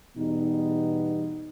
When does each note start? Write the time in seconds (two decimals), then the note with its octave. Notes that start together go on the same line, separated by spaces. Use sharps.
0.16 E2 B2 G3 B3 D#4